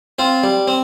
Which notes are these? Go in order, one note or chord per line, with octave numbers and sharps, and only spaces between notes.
C4 F4
G3
C4